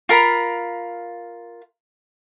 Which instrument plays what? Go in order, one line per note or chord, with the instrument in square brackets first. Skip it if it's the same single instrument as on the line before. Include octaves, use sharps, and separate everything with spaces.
[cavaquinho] F4 A#4 A#5 B5